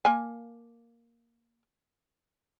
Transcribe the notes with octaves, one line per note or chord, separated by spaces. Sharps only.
A#3 G#5